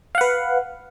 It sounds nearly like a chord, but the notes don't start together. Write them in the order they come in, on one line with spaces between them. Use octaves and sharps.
F5 F#5 B4